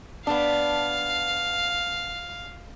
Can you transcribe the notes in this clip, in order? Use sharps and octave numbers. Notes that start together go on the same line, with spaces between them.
B3 D4 F5